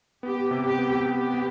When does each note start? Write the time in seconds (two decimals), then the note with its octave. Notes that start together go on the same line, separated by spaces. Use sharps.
0.23 B3 G4
0.51 C3
0.65 G4
0.79 B3
1.06 B3 G4
1.34 B3